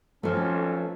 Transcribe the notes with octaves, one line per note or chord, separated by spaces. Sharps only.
B1 F2 F3 A3 C#4 A4